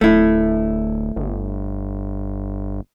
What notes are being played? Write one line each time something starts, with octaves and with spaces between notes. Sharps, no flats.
D1 A3 E4
G1